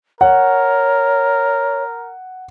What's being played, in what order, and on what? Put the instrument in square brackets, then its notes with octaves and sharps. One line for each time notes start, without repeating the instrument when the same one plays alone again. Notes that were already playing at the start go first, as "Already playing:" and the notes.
[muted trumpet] A#4 [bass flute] C#5 [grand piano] F#5